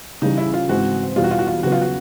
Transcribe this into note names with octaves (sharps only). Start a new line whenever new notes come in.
C#3 E3 G3 D#4
E4
F4
G#2 E3 G#3 C4 F#4
E2 B2 G3 F4
F#4
F4
F#4
F4
C#3 F#3 B3 F#4
F4
F#4